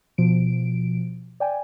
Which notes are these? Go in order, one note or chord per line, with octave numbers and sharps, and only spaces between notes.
B2 F3 D7
D5 G5 G#5